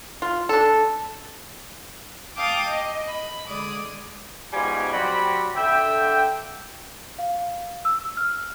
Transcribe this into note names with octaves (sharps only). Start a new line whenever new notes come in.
F4
D4 A4
F5 G5 A5 D6 D#6
D#5
B5
D3 G#3 D5 D#6
G#2 B2 F3 G3 G#5
F#3 G3 C4 F#4 D5 B5
D3 E5 G5
F5
E6
F6